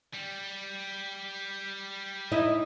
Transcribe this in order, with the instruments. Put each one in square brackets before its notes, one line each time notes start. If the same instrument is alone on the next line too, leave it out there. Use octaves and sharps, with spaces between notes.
[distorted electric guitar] G3
[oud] D#4 E4 D#5